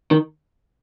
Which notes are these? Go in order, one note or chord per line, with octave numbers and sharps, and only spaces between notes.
D#3